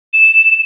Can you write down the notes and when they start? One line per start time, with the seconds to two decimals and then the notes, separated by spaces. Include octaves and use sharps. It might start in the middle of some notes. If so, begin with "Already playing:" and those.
0.13 E7